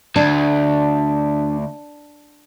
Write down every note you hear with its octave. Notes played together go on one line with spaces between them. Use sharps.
D2 D4